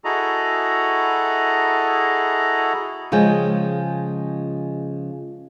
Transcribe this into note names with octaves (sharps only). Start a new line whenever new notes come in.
E4 F#4 G#4 A4 D#5 A#5
C#3 F3 G#3 G5